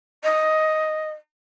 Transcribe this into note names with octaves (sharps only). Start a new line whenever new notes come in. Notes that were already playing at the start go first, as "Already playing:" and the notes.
D#5